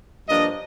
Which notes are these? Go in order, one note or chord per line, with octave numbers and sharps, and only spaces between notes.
G2 F3 A#3 D4 D#5